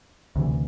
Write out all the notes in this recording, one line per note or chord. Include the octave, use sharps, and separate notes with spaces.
D2 C3 E3